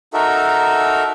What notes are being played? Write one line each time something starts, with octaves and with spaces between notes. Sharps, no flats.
D#4 F#4 A4 A#4 E5